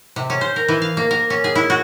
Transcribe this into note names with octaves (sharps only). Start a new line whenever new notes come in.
C3
C#4
C5
A#4
E3
F5
A#3
A#4
C#4
G#4
E4
F#4